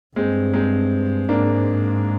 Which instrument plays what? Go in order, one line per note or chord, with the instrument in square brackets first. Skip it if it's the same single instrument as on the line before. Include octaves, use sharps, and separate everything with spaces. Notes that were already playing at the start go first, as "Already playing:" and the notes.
[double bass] G2 [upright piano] G#3 C4
[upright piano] G#3 C4
[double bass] G#2 [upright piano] A#3 D4